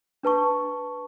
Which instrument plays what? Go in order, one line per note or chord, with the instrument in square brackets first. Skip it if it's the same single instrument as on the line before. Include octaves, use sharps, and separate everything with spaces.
[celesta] D4 B4 A5 C#6